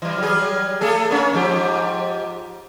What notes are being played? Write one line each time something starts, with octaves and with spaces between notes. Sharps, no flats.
E3 G3
F#3 G3 G#4
A3 G#4 A4
A#3 C#4
G#2 F3 G4